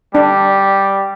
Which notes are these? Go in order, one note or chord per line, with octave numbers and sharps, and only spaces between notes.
G3 D4